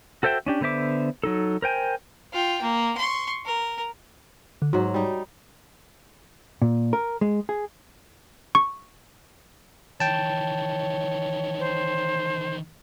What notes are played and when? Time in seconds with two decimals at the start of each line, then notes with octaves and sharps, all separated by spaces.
0.23 F#4 A4 C5 E5 G5
0.46 C#4 D4 G4
0.61 D3 B3 C5 E5 D6
1.24 F#3 D#4 A4
1.62 A#4 C5 G5 G#5
2.33 F4 G5
2.62 A#3
2.97 C6 C#6
3.45 A#4
4.62 D3
4.73 G#2 F#3 F#4
4.94 G3 D#4
6.62 A#2
6.93 A#4
7.21 G#3
7.49 G#4
8.55 C#6
10.00 D#3 E3 C#5 G5 A5
11.59 C5